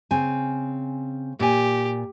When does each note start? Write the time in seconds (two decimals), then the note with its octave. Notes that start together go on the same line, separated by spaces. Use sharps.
0.11 C#3 C4 G#5
1.40 A#2 G4 G#5